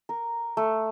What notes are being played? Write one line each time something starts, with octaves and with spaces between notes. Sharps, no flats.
A#4
A3